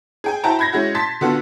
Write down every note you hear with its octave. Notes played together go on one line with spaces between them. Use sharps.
G#4 G5 G#5
E4 F#4 C5 G5 A5 A#5
B5 G6 G#6 A#6
G#3 C#4 E4 F#4
A5 C6 A6 B6
D3 B3 F4 F#4 A4